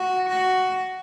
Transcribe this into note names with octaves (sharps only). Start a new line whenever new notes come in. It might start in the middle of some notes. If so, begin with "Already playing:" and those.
Already playing: F#4
F#4